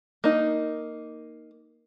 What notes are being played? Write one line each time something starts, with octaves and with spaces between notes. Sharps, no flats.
A#3 D#4